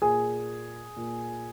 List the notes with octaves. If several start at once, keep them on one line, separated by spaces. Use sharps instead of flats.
A#2 G#4 G#5
A#2